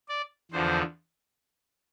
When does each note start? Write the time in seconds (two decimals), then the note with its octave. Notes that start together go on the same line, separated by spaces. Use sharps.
0.09 D5
0.51 E2 D3 F3 C5